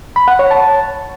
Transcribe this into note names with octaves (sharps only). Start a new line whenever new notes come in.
B5
F#5
C#5
A5